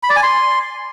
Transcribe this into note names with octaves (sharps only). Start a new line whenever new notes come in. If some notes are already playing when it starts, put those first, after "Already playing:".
B5
D5
G#5
C6